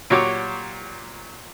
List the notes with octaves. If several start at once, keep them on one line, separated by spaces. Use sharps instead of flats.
A#2 F#3 G4 C#5 D6